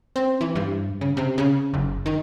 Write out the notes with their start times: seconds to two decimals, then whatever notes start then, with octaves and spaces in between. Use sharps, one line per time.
0.16 C4
0.41 E3
0.55 G2
1.01 C#3
1.17 C3
1.38 C#3
1.74 F#1
2.06 D#3